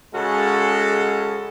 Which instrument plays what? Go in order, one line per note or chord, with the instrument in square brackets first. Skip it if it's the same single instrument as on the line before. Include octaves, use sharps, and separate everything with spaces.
[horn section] C#3 G#3 C#4 F#4 A4